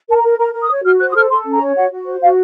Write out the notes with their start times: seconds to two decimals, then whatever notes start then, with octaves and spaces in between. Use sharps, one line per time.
0.09 A#4 A5
0.16 A#5
0.23 A#4
0.39 A#4 A#5
0.54 A#4
0.62 D#6
0.70 C#5
0.84 F#4 F6
1.00 C5 F#6
1.10 D#6
1.15 A4 F6
1.30 A4 C6
1.45 C#4
1.54 A#5
1.61 C#5
1.77 F#4 F#5
1.91 F#4
2.06 C5
2.22 F#4 F5